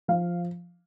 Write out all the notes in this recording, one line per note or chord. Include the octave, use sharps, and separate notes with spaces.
F3 F5